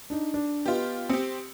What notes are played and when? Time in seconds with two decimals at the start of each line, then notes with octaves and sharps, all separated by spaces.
0.10 D4 D#4
0.34 D4
0.66 B3 F4 G4 B4 D#5
1.09 C4 G4 D#6 E6 C#7